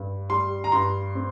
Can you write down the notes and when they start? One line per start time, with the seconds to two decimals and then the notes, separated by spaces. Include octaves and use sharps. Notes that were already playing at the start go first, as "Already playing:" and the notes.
Already playing: G2
0.29 G3 C6
0.64 A#5
0.72 G2 C6
1.15 C4